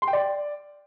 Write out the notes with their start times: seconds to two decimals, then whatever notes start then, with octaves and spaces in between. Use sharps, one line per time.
0.02 C6
0.08 G5
0.13 D5